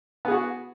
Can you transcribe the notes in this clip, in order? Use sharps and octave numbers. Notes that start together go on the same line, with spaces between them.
B3 F#4 G#4